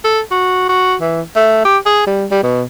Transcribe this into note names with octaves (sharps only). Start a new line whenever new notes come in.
A4
F#4
F#4
E3
A3
G4
G#4
G3
G3
B2